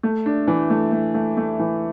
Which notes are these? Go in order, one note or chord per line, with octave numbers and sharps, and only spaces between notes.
A3
D4
E3
A3
A3
A3
A3
E3